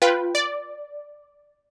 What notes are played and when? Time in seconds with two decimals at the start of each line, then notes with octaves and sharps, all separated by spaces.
0.02 F4 B4 G5
0.35 D5